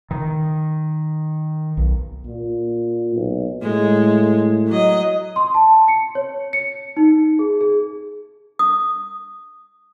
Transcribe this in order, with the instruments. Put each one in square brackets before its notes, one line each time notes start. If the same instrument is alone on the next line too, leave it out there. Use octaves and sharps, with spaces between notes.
[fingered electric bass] D#3
B1
[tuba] A#2
B1
[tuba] A2 [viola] G#3
[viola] F#3 D#5
[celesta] C6
A5
C#7
C#5
C#7
D#4
G#4
G#4
[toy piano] D#6